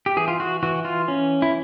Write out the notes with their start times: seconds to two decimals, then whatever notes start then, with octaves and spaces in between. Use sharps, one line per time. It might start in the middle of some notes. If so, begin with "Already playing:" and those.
0.06 G4
0.17 E3 G#4
0.28 F4
0.40 F#4
0.63 E3 F#4
0.85 F4
1.08 C#4
1.42 E4